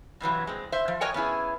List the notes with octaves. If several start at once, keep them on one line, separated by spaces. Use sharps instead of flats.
G2 C3 E3 F#3
G#3 C4
C5 E5
F3
F#4 A#4 C#5 D#5 G5 G#5
B3 C#4 E4 G#4